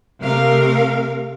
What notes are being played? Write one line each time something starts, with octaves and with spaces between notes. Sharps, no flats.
C3 A3 A#4 F5